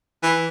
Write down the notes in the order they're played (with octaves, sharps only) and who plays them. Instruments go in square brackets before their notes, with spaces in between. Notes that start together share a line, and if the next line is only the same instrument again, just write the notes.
[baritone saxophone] E3